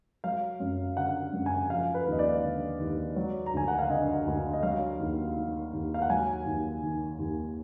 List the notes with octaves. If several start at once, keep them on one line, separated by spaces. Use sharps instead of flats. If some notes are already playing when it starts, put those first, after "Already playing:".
F#3 F5
F#2
D3 F#5
F#2
G#5
F3 F5
B4
D#2
D#5
D5
D3
D#2
F#3
A#5
D2 G#5
F#5
F5
D3 D#5
D2
D#5
F#3 F5
D#2
D#3
D#2
F5
F#5
F#3 G#5
D#2
D#3
D#2